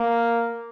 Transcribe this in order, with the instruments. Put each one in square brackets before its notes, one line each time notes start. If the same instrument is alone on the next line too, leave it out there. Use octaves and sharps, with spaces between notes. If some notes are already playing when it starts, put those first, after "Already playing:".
Already playing: [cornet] A#3